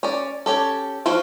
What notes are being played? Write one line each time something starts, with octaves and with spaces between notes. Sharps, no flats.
C#4 D5
C#4 G4 A4
F3 C4 F#4 C5 F5